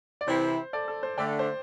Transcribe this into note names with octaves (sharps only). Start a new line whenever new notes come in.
D5
C3 E3 C4 E4 C5
A4 D5
A4
C5
D3 A3 D4 D5 G5
C5